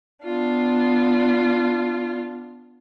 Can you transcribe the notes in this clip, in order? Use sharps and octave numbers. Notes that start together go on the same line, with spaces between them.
B3 D4 F4